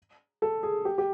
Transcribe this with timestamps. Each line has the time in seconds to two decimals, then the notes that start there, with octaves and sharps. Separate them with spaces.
0.42 A4
0.63 G#4
0.85 G4
0.98 G4